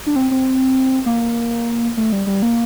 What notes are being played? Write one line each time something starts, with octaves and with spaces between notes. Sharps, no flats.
D4
C4
C4
A#3
A3
G3
G3
A#3